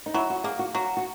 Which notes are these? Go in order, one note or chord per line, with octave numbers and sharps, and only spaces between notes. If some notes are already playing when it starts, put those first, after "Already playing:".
D#4
F#3 E4
F#4
A#3 G#4
F#4
F#3 F#4
F#4